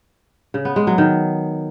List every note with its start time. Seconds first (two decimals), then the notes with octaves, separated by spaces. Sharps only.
0.54 C#3
0.65 B3
0.76 G#3
0.87 F#3
0.98 D#3